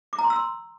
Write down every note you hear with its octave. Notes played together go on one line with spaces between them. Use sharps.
D6
A#5
C6
E6
C6